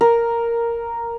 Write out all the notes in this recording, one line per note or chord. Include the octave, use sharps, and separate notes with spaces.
A#4